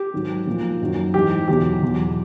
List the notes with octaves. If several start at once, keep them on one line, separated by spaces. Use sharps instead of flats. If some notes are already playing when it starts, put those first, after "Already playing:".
Already playing: G4
G#2 D#3 F#3
A#2 F3
F#2 D#3 F#3
G#2 E3 G4
E2 B2 F#3 G4
E2 B2 F#3